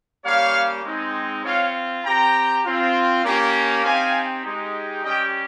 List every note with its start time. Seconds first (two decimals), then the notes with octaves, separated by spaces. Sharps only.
0.24 G3 A#3 C#4 G4 C#5 F5
0.85 G#3 C4 D#4
1.45 C4 F4 C#5 F5
2.05 C4 G4 G5 A#5
2.65 C4 F4
3.25 A#3 C#4 G4
3.84 C4 D#4 G4 F5 G#5
4.45 G#3 D#4 G4
5.04 G3 C#4 G4 D#5 G5